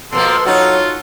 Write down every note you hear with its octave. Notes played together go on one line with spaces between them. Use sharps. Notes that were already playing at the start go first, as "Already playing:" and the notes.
B2 F3 A#3 A4 C6
F#3 D#4 F4 F#4